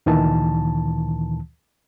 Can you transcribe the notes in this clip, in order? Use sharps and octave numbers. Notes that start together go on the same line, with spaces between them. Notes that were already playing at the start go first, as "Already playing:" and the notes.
D2 A#2 D#3 E3 A5